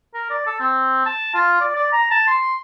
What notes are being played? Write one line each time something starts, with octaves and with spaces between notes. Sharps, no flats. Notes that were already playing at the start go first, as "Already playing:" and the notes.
A#4
D5
A4
C4
A5
F4
D5
D5
A#5
A5
C6